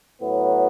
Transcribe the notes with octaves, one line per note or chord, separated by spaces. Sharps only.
A2 F#3 B3